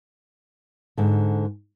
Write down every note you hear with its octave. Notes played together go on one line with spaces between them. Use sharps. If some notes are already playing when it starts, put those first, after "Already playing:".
G#2 D3